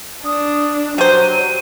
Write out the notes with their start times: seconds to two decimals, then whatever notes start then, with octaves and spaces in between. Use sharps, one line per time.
0.25 D4 D#6
0.98 F#3 G3 C5 D#7